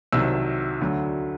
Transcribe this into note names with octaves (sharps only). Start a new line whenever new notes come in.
C2 C3 D#3 F#3 E6
D2 D3 F#3